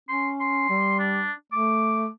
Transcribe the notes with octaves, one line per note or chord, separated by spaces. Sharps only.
C#4 C6
C6
G3
D4
A3 D6